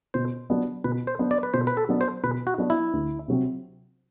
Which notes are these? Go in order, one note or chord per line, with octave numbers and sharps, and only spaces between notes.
B2 C5
F#3 B3 D4
B2 B4
C5
F#3 B3 D4
D5
B4
B2 C5
B4
A4
F#3 B3 D4
C5
B2 B4
F#4
F#3 B3 D4
E4
D2
C3 F#3 C4